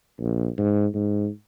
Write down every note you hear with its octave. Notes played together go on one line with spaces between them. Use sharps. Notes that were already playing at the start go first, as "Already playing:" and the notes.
A#1
G#2
G#2